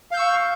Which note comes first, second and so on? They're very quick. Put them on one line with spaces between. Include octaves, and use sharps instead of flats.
F5 G6 E6 C#6